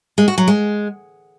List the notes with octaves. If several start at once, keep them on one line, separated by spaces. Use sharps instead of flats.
G#3
F#4
F#3
G#3